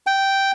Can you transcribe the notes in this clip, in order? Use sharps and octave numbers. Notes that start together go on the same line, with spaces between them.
G5